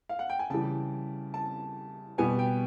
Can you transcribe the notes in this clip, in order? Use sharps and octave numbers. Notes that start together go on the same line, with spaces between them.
F5
F#5
G5
G#5
C#3 E3 G3 A5
A5
B2 G3 B3 G#5
G5